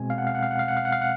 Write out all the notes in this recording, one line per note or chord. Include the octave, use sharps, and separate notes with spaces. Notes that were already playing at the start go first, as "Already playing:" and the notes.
Already playing: B2 G#3 C4 G#5
F5
F#5
F5
F#5
F5
F#5
F5
F#5
F5
F#5
F5
F#5